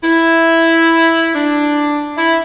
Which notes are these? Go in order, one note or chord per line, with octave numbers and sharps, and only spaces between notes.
E4
D4
E4